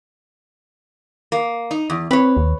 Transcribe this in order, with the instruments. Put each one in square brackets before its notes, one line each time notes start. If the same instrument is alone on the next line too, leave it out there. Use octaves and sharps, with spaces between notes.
[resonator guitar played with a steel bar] A#3
D#4
E2
[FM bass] C4 [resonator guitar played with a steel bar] B4 C#5
[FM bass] D#2